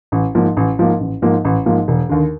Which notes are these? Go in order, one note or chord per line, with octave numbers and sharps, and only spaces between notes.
A1
G#2 F3 A#3
A1
G#2 F3 A#3
A1
G#2 F3 A#3
A1
G#2 F3 A#3
E1
D#2 D3